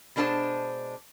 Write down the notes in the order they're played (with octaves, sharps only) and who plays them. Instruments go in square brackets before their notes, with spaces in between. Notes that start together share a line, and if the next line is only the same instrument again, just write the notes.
[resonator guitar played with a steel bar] B2 G#3 D4 A4 C5 A5